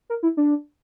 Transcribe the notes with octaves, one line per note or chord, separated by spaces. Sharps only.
A#4
E4
D4